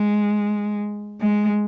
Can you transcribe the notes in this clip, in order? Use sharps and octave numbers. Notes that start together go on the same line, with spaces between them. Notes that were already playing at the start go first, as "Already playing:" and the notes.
Already playing: G#3
G#3